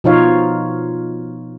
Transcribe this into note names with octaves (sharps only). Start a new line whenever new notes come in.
B2 F3 D#4 F4 C#5 F5